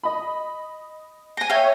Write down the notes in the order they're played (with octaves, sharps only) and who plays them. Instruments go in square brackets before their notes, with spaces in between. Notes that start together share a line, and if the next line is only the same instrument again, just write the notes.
[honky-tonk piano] D#5 B5
[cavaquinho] G5 G#5 [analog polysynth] A#6 D#7
[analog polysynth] C#5 [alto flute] E5 [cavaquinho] F5 G5